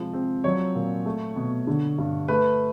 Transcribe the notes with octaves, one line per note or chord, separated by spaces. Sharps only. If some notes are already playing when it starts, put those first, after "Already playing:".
Already playing: C3 F3 G#3
C4
F#3 C#5
A#2
A3
B2
D3
G2
A3 B4